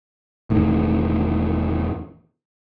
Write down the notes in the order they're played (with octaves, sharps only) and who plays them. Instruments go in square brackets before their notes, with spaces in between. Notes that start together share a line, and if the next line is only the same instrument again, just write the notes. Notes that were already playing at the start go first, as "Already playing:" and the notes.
[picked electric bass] E1 A2 D#3